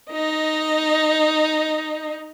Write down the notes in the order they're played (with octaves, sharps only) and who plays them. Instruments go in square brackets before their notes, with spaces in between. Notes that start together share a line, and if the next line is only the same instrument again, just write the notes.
[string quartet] D#4 D#5